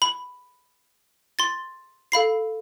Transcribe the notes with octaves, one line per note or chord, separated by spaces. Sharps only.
B5
C6 A6
A4 F5 B5 C7